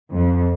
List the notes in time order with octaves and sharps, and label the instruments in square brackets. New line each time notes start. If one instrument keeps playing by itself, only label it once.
[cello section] F2